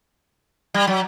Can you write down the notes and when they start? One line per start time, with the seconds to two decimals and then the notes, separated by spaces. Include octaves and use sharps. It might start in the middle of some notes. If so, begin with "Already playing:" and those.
0.74 G3
0.87 F#3